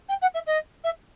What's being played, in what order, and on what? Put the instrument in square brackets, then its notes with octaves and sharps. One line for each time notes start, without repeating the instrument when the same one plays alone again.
[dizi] G5
F#5
E5
D#5
E5